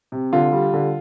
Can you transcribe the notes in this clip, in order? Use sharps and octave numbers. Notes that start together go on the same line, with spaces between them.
C3
D3 F4
G3
D3